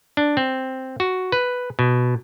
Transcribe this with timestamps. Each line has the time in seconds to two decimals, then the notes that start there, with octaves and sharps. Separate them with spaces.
0.17 D4
0.37 C4
1.00 F#4
1.32 B4
1.79 B2